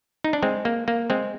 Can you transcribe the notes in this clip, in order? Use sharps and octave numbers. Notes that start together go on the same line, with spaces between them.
D#4
D4
G#3 C4
A#3
A#3
G#3 C4